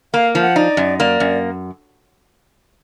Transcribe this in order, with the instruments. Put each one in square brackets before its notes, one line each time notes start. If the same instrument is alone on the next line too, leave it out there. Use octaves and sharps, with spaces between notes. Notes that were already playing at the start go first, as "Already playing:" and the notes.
[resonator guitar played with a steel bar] A#3 [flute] F5
[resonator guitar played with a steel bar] F3
[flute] F#5
[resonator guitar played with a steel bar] D#4 [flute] D5
[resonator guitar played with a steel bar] F#2
[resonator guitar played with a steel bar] A#3 [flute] D5
[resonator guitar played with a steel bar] F#2